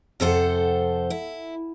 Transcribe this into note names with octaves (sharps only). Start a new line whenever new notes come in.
F2 C3 A4 C5 F#5
E4